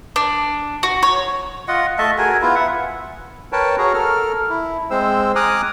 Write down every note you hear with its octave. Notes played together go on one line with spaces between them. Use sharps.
D4
F#4
C#5
F4 D#5 F#5
A3 D#5 E5 A5
F#4 G#4 A#4 G#5
B3 E4 F4
E5 F#5
A#4 B4 C#5 G5 A5
F#4 G#4 C#5 A#5
A4 A#4 F6
E4
G#3 C4 C5 E6
G#5 A#5 D6 D#6 F6 F#6